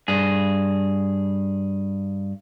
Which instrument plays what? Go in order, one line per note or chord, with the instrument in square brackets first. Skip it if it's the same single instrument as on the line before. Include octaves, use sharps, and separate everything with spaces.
[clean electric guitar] G2 G#4